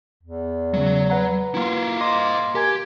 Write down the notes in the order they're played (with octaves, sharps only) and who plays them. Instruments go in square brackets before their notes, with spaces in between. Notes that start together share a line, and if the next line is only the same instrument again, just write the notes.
[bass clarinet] E2
[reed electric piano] C#3 G#3 [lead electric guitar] F#3
[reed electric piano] B4 F#5 A#5
[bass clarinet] A#3 [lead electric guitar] E4 F4
[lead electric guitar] C5 D#5 [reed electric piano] C6 D6
[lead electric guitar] G4 [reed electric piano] A#4 G#5 G#6